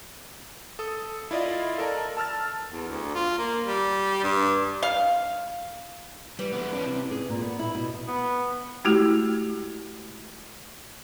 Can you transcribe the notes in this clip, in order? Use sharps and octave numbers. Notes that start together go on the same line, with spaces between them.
A4 D#6
E4 F4 D5 D#5 F5
A4 A#4 D5 A5 A#5
A5 E6 F6 A6
E2
D2
F4
A#3
G3
G2
F5
E3 G3
G#3 B3
C#4 D4
C3
G#4
A#2
B3
E4
B2
B3
G#3 A3 E4 F#4 G4